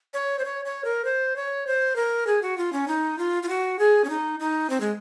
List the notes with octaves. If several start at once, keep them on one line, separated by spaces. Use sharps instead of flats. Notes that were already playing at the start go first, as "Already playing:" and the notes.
C#5
C5
C#5
C#5
A#4
C5
C#5
C5
A#4
G#4
F#4
F4
C#4
D#4
F4
F4
F#4
G#4
C#4
D#4
D#4
C4
G#3